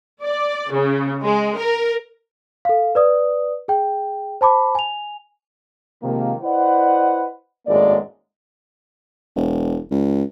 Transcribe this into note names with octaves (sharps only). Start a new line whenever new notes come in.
D5
C#3
G#3
A#4
A4 F5
B4 D5 D#6
G#4 G5
C5 A5 B5 D6
G#5 F7
C3 D#3 F3 G#3 A#3
E4 B4 C5 D5 D#5 F#5
G#1 F#2 A2 G#3 A#3 D5
E1
C#2